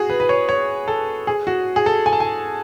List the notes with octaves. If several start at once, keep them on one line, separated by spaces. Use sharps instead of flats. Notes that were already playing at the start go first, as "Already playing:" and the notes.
Already playing: F#4 G#4
B4
B4
C#5
C#5
A4
G#4
F#4
G#4
A4
G#5
A5
G#5